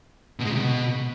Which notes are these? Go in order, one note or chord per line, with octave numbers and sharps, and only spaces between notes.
B2
G#3
C#3
C3
B2